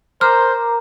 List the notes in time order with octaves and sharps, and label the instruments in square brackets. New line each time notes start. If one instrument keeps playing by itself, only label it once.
[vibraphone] A#4 A#5 D6 [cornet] C5 [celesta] F6